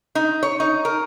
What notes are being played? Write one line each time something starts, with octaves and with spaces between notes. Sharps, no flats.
D#4
C#5
D#4
A#4